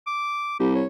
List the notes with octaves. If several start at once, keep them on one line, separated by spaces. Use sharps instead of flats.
D6
C2 G4
C#5